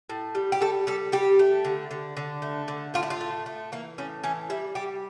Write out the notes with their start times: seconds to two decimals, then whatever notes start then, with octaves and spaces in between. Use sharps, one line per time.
0.10 A2
0.35 G3
0.52 G4
0.61 G3 A4
0.87 G3 A4
1.12 G3 G4
1.39 A3
1.65 D3
1.91 D3
2.17 D3
2.42 A3
2.68 D3
2.94 A2 F4
3.03 E4
3.10 F4
3.21 A3
3.46 A3
3.72 E3 A#3
3.98 A2 C#4
4.24 E3 C#4
4.50 G3 E4
4.75 G3 G4